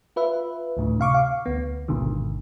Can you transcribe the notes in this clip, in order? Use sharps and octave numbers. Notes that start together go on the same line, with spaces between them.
F4 B4 E5
D2 A2 D3
C3 F5 C#6 D6
F5
D2 B3
G#1 G#2 B2 D3 D#3